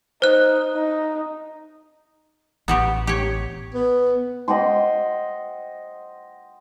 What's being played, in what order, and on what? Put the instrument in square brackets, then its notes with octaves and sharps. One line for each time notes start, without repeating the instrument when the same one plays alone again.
[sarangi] D#4 [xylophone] C5 F#6
[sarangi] D#4
[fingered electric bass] A1 [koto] B3 F#4 G4
[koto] G4 C#5
[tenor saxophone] B3
[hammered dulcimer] D#5 F#5 G5 C6